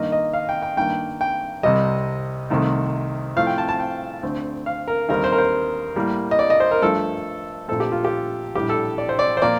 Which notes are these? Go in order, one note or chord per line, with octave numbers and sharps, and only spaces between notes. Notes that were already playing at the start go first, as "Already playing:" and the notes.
Already playing: G2 D#3 A#3 D#5
D#5
F5
G5
G5
G2 D#3 A#3 G5
G5
C2 C3 G3 D#5
C2 C3 D#3 A3
A2 F3 A3 C4 F5
G5
A5
A5
G5
D2 D3 A3 C4
F5
A#4
D#2 D3 G3 C4 A#4
C5
A#4
C5
A2 G3 A#3
D#5
D5
D#5
C5
A#4
G2 F3 A3 A4
A#1 A#2 A3 C4 A4
G4
F4
G4
A#1 A2 G3 G4
A4
D5
C5
D5
C5
A#2 F3 A#3 D5